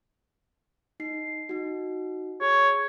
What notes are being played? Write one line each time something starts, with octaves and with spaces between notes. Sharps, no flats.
D#4 C7
D#4 F#4
G#4 C#5